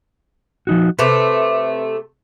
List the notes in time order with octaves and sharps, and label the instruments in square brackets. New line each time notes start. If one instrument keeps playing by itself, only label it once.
[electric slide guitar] F3 D#4 F#4
[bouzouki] C3 A3 [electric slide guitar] B4